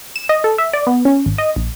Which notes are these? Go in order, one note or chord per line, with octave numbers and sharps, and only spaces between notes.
E7
D#5
A4
E5
D5
B3
C#4
G#1
D#5
A#1